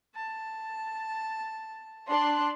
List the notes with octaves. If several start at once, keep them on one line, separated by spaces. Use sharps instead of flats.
A5
D4 A5 C6 F#6